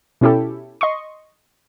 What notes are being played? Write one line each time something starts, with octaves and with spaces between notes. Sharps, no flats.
B2 C#4 E4 G4 A4
D#5 C6 C#6